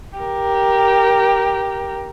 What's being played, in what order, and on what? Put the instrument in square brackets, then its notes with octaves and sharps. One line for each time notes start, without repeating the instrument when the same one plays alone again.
[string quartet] G4 A#4